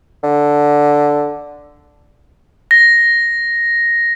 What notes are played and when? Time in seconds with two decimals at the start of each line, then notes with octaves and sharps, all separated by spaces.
0.23 D3
2.71 A#6